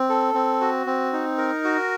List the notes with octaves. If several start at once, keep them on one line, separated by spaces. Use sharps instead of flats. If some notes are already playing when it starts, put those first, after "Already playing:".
Already playing: C4
A4
C4
F#4
C4
D#4
A#4
F#4